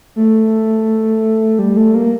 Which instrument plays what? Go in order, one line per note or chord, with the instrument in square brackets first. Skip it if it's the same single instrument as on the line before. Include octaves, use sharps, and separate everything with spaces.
[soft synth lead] A3
G3
A3
A#3